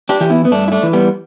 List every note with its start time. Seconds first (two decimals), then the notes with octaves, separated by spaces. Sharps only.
0.09 D4 G4
0.20 E3 G4
0.30 B3 E4
0.45 B3
0.51 G2 A3 D4
0.68 E4
0.72 A3 D4
0.83 E3
0.93 G3 B3